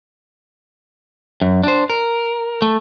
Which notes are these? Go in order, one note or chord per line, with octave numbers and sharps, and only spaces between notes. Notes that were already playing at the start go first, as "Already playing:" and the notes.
F#2
D4 C5
A#4
A3